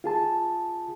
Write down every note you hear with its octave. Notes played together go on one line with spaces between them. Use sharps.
F4 G#4 A5